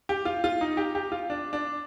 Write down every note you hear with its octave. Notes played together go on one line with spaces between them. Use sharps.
G4
F4
F4
D#4
G4
G4
F4
D4
D4